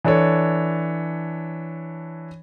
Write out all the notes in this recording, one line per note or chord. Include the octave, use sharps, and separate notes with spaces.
E3 D4 A4 C#5